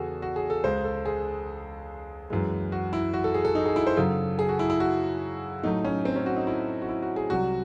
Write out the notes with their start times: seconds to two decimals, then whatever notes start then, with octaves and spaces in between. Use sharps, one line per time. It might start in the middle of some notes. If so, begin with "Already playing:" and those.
Already playing: E2 C#3 E3 F#4 G#4 A4
0.22 F#4
0.36 G#4
0.50 A4
0.64 C#2 C#3 G#3 C5
0.84 A4
1.06 G#4
2.30 F#2 E3 G#3
2.72 F#4
2.93 E4
3.14 F#4
3.24 A4
3.35 G#4
3.45 A4
3.55 D#4
3.66 G#4
3.76 E4
3.87 C5
3.97 F#2 C#3 F#3 A4
4.39 G#4
4.49 F#4
4.59 E4
4.70 E4
4.80 F#4
5.63 A2 F#3 A3 D#4
5.85 C#4
6.05 C4
6.16 C#4
6.26 F#4
6.36 D#4
6.47 E4
6.82 F#4
6.89 E4
7.02 F#4
7.16 G#4
7.30 C2 C3 F#3 F#4